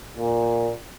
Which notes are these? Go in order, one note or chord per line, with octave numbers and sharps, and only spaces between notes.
A#2